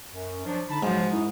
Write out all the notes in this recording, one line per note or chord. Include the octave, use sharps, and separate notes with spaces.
F#2
F3 F#3 D4
D3 D#4 A5 B5
G#2 F3 F#3
F#2 D#4 E4